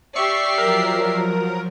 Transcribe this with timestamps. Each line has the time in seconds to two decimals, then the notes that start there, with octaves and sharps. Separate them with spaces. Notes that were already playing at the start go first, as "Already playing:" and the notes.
0.16 G4 D5 E5 C#6 C7
0.58 F3 F#3 A#4